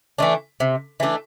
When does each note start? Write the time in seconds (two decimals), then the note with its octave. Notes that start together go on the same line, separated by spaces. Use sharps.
0.18 E3 A3 D4
0.60 C3
1.00 E3 A3 D4